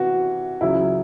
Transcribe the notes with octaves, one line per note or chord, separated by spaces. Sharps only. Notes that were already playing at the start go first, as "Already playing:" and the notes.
Already playing: C3 E3 F#4
C#2 C#3 F#3 E4